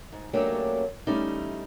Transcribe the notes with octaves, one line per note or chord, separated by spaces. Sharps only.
G#2
F#3 A3 A#3 C#4 D4 G4
E3 G3 A3 C#4 D#4